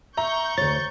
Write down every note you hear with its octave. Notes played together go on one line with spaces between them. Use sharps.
E5 A#5 C#6 G6
D2 C#5 A6